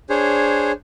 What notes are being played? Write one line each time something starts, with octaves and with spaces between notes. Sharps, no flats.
D4 G#4 C5 C#5